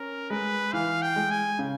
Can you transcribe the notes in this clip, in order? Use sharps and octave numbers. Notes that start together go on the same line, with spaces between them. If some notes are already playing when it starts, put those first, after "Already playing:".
Already playing: C#4 A#4
G#3 B4
E3 F5
G5
G#3
G#5
C#3